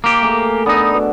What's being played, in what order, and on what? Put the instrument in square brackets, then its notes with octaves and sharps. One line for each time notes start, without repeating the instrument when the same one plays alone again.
[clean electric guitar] A#3 G4
[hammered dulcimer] A3 G#4 A#4
[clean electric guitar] B3 D#4 [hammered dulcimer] D4 A4
[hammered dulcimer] B2